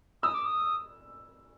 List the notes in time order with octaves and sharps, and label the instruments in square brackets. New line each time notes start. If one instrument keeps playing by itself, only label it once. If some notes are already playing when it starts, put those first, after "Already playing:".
[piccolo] D#6 [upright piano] E6
[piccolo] D6
D#6